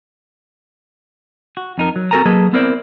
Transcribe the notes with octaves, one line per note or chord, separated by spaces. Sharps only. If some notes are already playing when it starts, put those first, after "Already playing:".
F#4
F2 D#4 A#4
F#3
C4 F#4 A4 A#4 G#5 A#5
F#3 A#3 G#4 A4 B4 D#5
B3 C4 E4 A#4 C5 D5